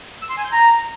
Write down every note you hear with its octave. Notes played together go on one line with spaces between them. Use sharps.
E6
C6
G#5
G6
A#5